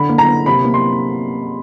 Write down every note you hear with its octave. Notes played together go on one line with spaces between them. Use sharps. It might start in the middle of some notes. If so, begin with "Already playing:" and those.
Already playing: D3 B5
A#3
A#5
A#3
C3 B5
A#3
C6